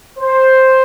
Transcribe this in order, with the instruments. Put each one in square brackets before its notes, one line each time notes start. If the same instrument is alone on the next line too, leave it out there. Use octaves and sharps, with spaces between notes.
[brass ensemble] C5